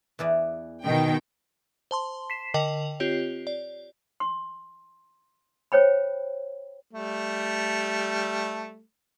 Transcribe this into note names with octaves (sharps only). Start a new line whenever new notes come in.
E2 E3 D5
B2 D#3 G5
C5 A5 C6
B6 C7 E7
D3 A#4 D#5 G5 F7 F#7
C4 F4 G4 C#5
D5
C6
C5 C#5 G5 B5
G3 A3